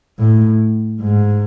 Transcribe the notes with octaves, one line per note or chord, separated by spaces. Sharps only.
A2
G#2